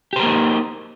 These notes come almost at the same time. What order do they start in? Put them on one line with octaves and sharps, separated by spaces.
G4 C5 A#4 A#3 D#4